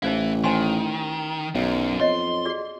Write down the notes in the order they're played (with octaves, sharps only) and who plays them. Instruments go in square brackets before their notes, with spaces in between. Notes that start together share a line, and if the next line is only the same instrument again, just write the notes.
[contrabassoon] A1 [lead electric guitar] E3 E4 [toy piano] D#4 C5 F5
[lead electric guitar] D#3 [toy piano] C5 G#5 C6
[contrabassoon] B1 [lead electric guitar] F#2
[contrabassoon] F2 [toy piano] C#5 D#5 [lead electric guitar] C6
[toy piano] F#4 G#4 D5